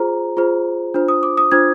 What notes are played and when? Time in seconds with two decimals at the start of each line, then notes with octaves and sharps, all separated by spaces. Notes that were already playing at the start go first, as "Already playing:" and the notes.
Already playing: F4 G#4 C5 A#5
0.37 F4 G#4 C5
0.94 D4 F4 C5
1.08 D#6
1.23 D6
1.37 D#6
1.52 D4 F4 C5 G#6